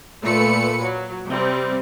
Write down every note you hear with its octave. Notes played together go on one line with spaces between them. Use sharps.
A#2 A3 B4 C#7
F#3
C3 G3 C4